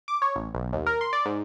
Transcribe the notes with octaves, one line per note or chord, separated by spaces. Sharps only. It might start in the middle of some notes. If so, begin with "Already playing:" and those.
D6
C#5
A1
B1
D#2
A#4
C6
D5
G#2